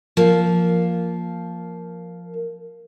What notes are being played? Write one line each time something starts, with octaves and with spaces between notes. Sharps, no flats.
F3 A#3